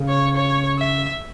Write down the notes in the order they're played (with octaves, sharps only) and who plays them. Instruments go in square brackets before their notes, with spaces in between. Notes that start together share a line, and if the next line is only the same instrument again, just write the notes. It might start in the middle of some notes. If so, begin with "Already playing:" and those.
Already playing: [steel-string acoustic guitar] C#3
[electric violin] C#5
C#5
E5